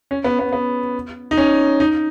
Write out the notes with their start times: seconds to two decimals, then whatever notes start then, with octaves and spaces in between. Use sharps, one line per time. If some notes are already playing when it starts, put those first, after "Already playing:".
0.11 C#4
0.24 B3
0.39 B3
0.53 B3
1.31 D#4
1.37 C#4
1.80 D#4